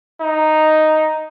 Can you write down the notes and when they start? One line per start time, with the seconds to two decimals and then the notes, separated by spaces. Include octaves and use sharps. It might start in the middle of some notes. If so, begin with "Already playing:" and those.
0.21 D#4